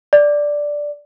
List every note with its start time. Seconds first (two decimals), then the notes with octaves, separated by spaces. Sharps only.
0.13 D5